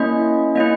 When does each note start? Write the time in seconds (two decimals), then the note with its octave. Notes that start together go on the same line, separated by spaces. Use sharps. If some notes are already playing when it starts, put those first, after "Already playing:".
Already playing: A#3 C#4 E4 D#5
0.55 A#3 C#4 E4 D#5